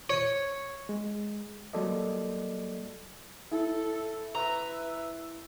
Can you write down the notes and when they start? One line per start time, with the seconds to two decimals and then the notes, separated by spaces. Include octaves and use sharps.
0.10 C#5
0.89 G#3
1.73 F#3 G3 A#3 A4 D5 D#5
3.51 E4 A4
4.35 B4 E5 A#5